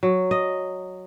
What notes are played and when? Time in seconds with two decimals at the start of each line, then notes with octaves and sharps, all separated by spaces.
0.03 F#3
0.31 D#5